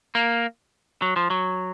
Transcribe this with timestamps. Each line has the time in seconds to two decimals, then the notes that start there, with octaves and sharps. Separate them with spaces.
0.15 A#3
1.02 F#3
1.16 F3
1.30 F#3